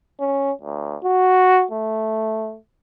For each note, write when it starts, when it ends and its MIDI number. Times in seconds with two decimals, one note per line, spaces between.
0.20 0.52 61
0.62 0.96 38
1.04 1.65 66
1.71 2.57 57